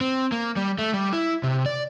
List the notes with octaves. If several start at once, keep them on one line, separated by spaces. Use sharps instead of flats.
C4
A#3
G3
A3
G3
E4
C3
D5